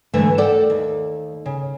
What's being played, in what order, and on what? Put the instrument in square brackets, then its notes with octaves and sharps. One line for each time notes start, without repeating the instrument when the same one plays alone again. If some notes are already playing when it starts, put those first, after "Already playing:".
[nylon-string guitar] G#2 D3 E3 A3 E5
A4 A#4 D5 F#5 G5
D#2
C#3